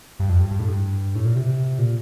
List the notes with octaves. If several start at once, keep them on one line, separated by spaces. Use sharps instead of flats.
G2
F2
G2
G2
A2
G2
A2
A#2
C3
C3
A#2